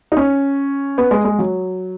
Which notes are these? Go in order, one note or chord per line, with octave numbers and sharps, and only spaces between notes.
D#4
C#4
B3
G#3
G#3
F#3